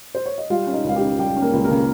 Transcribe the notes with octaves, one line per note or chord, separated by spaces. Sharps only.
C5
C#5
D#5
G3 F4 F5
C#4
D#4 D#5
C#2 F5
G4 G5
C#3
G3 G4 G5
C#4
A#3 A#4
C#2
A#3 A#4
C#3